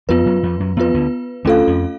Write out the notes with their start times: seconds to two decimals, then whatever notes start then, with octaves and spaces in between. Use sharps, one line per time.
0.09 F2 F3 B3 F4 B4
0.26 F#2 F#3
0.43 F2 F3
0.60 F#2 F#3
0.77 F2 F3 B3 F4 B4
0.94 D2 D3
1.45 D2 D3 A3 C#4 F4 A4 F5
1.67 F2 F3